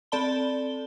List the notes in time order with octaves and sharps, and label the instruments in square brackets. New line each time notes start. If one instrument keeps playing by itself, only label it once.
[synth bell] C4 A4 D5 A5 B5 G7